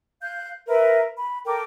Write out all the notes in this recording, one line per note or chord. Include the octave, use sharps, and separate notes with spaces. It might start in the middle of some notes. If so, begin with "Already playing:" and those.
F5 F#6 G6
A#4 B4 E5
B5
A4 A#4 G5 D6